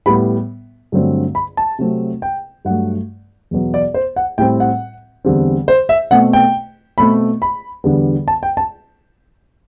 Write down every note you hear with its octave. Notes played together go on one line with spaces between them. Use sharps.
A2 G3 B3 B5
G2 D3 F#3 A3 C4
B5
A5
C3 F#3 A3 C4
G5
G2 F#3 A3 F#5
E2 B2 F#3 B3
D5
C5
F#5
A2 G3 C4 G5
F#5
E2 D3 G3 C4
C5
E5
B2 A3 C4 F#5
G5
B2 A3 C4 B5
B5
E2 D3 G3 B3
A5
G5
A5